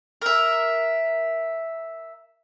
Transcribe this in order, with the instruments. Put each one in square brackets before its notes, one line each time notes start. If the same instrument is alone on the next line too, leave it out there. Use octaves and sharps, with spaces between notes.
[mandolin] A#4 E5